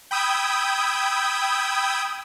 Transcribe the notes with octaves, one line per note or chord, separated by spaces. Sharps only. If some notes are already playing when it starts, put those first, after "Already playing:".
G5 B5 D#6 E6 G6 G#6